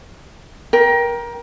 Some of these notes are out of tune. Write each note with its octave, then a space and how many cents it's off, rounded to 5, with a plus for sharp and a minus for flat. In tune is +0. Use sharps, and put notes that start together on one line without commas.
A#4 +25 G5 +0